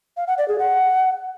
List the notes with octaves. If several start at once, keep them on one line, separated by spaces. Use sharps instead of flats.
F5
F#5
D5
G#4
F#5